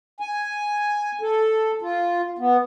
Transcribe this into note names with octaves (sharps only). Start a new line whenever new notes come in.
G#5
A4
F4
B3